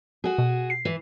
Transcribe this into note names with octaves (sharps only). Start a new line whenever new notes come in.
F#4 G#4
B2
C7
E3